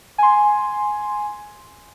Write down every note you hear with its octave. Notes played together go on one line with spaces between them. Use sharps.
G#5 C6